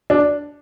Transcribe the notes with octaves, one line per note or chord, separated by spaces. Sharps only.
D4